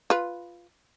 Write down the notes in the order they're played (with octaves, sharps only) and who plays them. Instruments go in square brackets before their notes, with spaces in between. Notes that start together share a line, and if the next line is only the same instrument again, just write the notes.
[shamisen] F4 B4